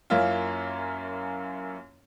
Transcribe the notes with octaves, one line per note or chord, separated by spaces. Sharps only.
F#2 A#3 C#4 E4 F4